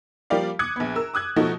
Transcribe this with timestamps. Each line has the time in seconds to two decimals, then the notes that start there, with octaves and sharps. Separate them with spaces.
0.30 F3 G3 A#3 G4 D5 F5
0.59 D6 D#6 F#6 G#6 C#7
0.76 A#1 B3
0.95 A#4 E6
1.14 D6 D#6 F#6 G#6
1.36 B2 F3 A3 D#4 F#4